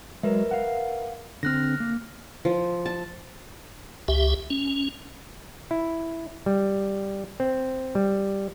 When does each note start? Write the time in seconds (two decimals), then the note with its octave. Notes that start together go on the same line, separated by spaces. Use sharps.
0.23 F#3 G#3 A#4 B4 E5
0.51 F5 F#5
1.43 D3 C4 F6 F#6 A#6
1.80 A#3
2.45 F3
2.85 A5
4.08 C#2 G4 E5
4.50 C#4
5.71 E4
6.46 G3
7.40 C4
7.95 G3